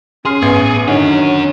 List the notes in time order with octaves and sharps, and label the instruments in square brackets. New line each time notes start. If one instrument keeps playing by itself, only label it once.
[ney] C#4 [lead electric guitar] G#4 [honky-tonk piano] C6 F6 C7
[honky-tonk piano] A1 B3
[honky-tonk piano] D3 D#3 [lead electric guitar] C#4 F#4 [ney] C#5
[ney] C#5